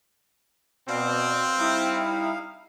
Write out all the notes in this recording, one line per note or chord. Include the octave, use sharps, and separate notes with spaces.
B2 C4 D5 F5
G3 D#4 E4